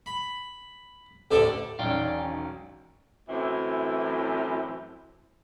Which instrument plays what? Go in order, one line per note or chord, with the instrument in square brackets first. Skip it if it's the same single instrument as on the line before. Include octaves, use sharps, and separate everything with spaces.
[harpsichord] B5
A1 D2 D4 A4 D5
[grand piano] E1 B1 [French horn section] D#3 C#4 [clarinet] D5 [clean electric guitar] F5 G5
[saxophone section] F#2 A2 E3 C4